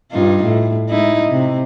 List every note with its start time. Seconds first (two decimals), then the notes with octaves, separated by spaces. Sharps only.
0.11 G2 D#4 F4
0.44 A2
0.89 G#3 D#4 E4
1.30 C3